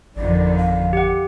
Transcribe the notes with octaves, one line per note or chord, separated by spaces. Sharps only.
G#1 F2 D3 D#3 D5
F5
G4 F#5